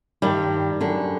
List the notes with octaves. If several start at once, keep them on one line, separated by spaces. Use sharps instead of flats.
G2 D#3 G3
F#2 D3